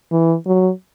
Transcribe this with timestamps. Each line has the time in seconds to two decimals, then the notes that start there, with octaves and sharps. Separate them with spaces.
0.12 E3
0.46 F#3